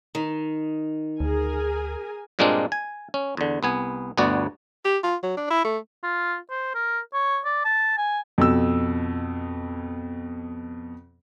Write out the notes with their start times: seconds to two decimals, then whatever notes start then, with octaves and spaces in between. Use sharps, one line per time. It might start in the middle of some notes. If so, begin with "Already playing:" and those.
0.15 D#3
1.20 D2 G#4 A#4 G#5
2.39 G2 A#2 G#3 A#3 C4 D4
2.72 G#5
3.14 C#4
3.37 E2 D3
3.63 C2 B3 G#5
4.17 G1 D2 B3 F#4 D5
4.85 G4
5.04 F4
5.23 F#3
5.37 D4
5.50 E4
5.65 A3
6.03 F4
6.50 C5
6.75 A#4
7.13 C#5
7.45 D5
7.65 A5
7.98 G#5
8.38 F2 B2 E6